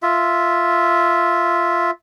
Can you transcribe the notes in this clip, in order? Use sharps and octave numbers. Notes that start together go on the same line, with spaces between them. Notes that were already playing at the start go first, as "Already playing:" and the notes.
F4 E5